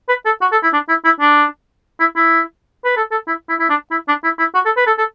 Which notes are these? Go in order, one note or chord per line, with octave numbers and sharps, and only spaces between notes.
B4
A4
F#4
A4
E4
D4
E4
E4
D4
E4
E4
B4
A4
A4
E4
E4
E4
D4
E4
D4
E4
E4
F#4
A4
B4
A4
A4